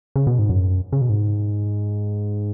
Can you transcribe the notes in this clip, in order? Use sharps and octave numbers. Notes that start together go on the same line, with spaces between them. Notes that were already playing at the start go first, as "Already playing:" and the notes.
C#3
B2
G#2
F#2
C#3
B2
G#2